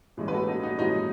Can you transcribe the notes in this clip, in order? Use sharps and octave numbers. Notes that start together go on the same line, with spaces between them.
A2 E3 G#3
B4
F#4 A4
D#4 F#4
D#4 F#4
A2 E3 G#3 D#4 F#4